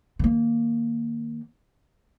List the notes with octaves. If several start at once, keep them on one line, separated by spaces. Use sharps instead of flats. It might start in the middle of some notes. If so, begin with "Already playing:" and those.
D#3 A#3